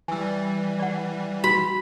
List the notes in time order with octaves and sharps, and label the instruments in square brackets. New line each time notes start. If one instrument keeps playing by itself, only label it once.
[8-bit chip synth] E3 G3 [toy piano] G#5 E6
[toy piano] D5 F#5
[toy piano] F#4 [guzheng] B5